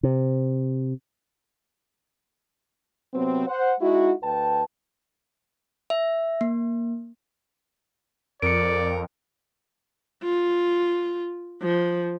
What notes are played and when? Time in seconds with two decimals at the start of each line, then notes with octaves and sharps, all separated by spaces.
0.03 C3
3.13 C3 F#3 B3 C4
3.47 C5 F#5
3.80 G#3 D#4 E4 F#4
4.22 D2 B4 G5 A5
5.90 E5
6.41 A#3
8.42 F2 A#4 D5 C#7 D7
10.23 F4
11.62 F3